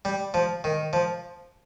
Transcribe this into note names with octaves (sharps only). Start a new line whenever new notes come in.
G3
F3
D#3
F3